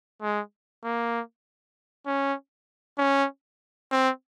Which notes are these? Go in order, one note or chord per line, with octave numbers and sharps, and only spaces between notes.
G#3
A#3
C#4
C#4
C4